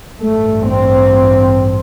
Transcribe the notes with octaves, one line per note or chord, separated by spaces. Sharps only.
A1 G2 A3
C4